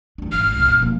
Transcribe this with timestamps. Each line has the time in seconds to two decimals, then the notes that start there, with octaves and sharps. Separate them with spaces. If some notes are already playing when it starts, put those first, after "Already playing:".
0.18 E3 D4
0.32 G#1 F6
0.52 C2 C3
0.66 B2 B3
0.80 F3 A#3